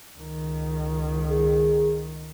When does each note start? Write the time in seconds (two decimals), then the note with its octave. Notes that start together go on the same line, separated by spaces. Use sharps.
0.15 C#2 D#3
1.31 G#4